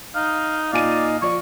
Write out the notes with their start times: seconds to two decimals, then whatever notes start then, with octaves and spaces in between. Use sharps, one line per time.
0.15 D#4 F5
0.73 A#2 D#4 D5 D#5 F5 G#5 D#7
1.22 F3 D5 C#6